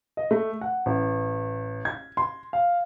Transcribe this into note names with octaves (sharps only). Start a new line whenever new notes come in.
D#5
A3
F#5
A1
G#6
C6
F5